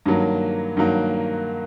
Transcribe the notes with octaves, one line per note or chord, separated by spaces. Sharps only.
G2 D#3 F#3 A#3
G2 D#3 F#3 A#3